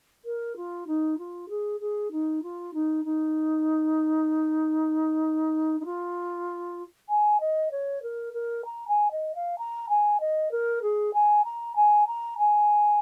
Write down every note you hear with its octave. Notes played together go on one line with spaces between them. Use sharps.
A#4
F4
D#4
F4
G#4
G#4
D#4
F4
D#4
D#4
D#4
F4
G#5
D#5
C#5
A#4
A#4
A#5
G#5
D#5
F5
A#5
G#5
D#5
A#4
G#4
G#5
A#5
G#5
A#5
G#5